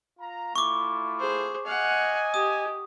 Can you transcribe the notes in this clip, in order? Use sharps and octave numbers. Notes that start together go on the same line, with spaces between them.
F4 A#5
A3 E4 F4 C#6 D6
G#4 C5
D#5 F5 F#5 G#5
G4 D#6